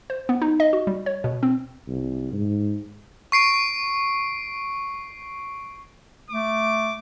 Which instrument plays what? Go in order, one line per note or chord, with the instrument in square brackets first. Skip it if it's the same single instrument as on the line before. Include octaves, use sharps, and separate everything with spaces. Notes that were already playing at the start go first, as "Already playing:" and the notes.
[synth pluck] C5
B3
D#4
D#5
F#4
G3
C#5
B2
C4
[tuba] C2
G#2
[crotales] C#6 C7 D7
[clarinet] A3 [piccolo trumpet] D6